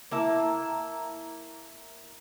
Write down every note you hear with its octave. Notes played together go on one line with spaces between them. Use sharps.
A#3 E4 A5